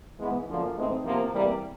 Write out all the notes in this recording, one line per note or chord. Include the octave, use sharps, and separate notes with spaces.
G#2 E3 G#3 B3
F#2 D3 F3 A#3
A2 E3 G#3 C4 D#4
E2 C3 F3 A#3
E2 C3 E3 G3 A#3